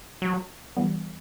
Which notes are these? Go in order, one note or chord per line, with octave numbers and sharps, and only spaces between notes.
F#3
E3 G3 B3